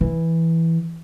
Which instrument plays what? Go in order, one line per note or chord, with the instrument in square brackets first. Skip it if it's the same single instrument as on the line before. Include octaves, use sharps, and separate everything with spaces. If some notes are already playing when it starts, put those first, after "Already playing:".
[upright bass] E3